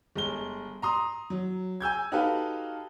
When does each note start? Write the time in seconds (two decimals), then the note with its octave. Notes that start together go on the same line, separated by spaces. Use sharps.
0.16 G1 G#3 G7
0.82 A#5 C6 D#6
1.30 F#3
1.80 G#5 E6 G6 G#6
2.12 D#4 F#4 G4 A4 B4 F5